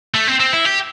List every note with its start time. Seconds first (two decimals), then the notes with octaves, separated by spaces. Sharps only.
0.14 A3
0.28 C4
0.40 C4
0.53 E4
0.65 G4